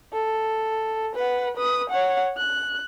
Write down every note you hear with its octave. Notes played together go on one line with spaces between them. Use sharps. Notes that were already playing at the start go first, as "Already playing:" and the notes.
A4
B4 F#5
B4 D#6
C#5 F#5
F#6